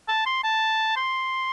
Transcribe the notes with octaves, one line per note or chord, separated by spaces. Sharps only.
A5
C6
A5
C6